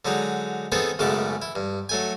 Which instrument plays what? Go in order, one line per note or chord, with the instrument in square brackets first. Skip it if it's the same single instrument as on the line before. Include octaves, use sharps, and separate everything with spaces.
[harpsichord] D3 F#3 G#3 D#4
D#3 B3 C4 G#4 A4
B1 F#2 C#3 G#3 A3 D6
E4
G2
F#3 A3 G#5